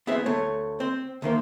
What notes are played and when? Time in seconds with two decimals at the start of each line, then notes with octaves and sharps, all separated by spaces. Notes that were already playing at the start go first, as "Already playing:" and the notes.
0.07 B3 C4 E4 G#4 E5
0.26 D2 A3 C#5
0.80 C4 C5
1.22 D2 D#3 A#3 C5